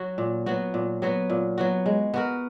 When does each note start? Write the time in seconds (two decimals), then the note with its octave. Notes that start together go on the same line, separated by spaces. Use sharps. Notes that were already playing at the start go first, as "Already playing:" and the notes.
Already playing: F#3 F#4
0.18 A#2
0.46 F#3 B3 F#4
0.74 A#2
1.02 F#3 B3 F#4
1.30 A#2
1.58 F#3 B3 F#4
1.86 G#3
2.14 B3 F#4 A#4